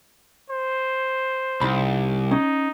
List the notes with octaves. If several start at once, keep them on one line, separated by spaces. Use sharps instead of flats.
C5
C2 D#4 B5
C#4 D#4